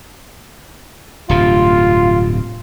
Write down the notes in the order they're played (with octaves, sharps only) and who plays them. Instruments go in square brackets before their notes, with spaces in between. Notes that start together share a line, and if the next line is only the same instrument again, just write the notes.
[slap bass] D1 G2 C3 [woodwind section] F4